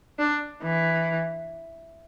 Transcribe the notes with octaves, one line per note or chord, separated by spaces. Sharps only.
D4
E3